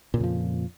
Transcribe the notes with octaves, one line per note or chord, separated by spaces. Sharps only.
F2 A#2 C#3 F3